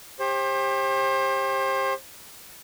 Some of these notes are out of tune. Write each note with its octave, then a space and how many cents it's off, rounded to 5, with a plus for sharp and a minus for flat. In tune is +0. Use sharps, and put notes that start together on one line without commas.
G4 +20 C5 +35